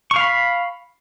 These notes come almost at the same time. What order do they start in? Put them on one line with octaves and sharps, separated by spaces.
C#6 F5 B5